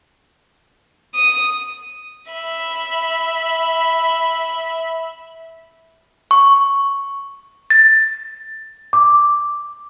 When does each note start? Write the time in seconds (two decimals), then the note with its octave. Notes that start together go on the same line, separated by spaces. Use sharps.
1.15 D#6
2.31 E5 B5
6.31 C#6
7.70 A6
8.93 D6